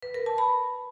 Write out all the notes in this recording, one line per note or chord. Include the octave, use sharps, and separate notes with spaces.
B4
A#4
A5
B5